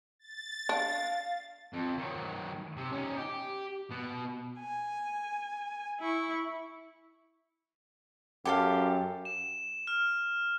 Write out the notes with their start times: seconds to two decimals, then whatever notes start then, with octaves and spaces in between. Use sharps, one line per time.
0.19 A6
0.69 D4 F5
1.73 F2
1.97 D#3 F#3
2.77 C3
2.92 C#4 D#4
3.18 G4
3.91 B2
4.60 G#5
6.00 E4 C#6
8.45 F#2 G4 A4 F5
9.25 E7
9.87 F6